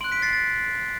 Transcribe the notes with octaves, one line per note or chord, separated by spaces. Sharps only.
C6 F#6 D7 F#7
B6 D7
A6 C7
A6